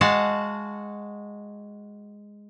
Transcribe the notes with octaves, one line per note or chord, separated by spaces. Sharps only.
G#3 F#4 F5 F#5 A5